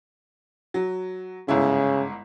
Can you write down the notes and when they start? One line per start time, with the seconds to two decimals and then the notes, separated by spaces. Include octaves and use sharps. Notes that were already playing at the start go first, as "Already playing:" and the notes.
0.74 F#3
1.48 G1 G#2 C#3 E4